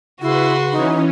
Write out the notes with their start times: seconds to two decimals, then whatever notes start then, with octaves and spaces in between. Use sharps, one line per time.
0.22 C#3 E4 F#4 B4 C6
0.72 E3 C#4 D#4